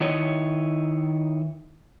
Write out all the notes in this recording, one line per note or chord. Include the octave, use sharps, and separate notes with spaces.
D#3 E4 C#5 D#5